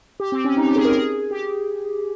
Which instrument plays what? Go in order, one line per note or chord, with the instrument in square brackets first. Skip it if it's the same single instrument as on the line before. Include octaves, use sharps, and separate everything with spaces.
[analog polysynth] G4
C4
C#4
D#4
G4
G#4
A#4
G#4
G4